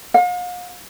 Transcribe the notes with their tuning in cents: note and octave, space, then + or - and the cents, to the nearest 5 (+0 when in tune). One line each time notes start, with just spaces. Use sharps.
F5 +45